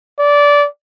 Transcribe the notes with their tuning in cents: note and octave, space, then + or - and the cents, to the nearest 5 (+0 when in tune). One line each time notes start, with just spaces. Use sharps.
D5 -20